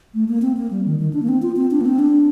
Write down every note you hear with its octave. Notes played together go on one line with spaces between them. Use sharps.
A3
A#3
C4
A#3
G3
D#3
D#3
D4
A#3
C4
F4
C4
D4
A#3
C4
D4